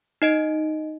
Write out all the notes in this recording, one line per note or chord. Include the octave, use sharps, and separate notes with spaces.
D#4 D#5 D7